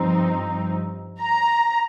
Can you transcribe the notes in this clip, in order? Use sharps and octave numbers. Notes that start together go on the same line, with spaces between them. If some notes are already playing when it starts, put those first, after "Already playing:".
Already playing: G2 F3 C4 D#4
A#5